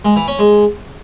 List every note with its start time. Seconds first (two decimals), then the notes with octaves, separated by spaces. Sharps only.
0.05 G#3
0.16 E3
0.28 C#4
0.39 G#3